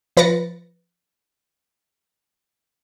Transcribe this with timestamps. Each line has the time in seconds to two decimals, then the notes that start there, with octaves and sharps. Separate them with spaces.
0.17 F3 B4 A6 A#6 C#7